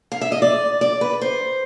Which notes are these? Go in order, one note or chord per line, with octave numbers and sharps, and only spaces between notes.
F5
E5
D#5
D5
D5
B4
C5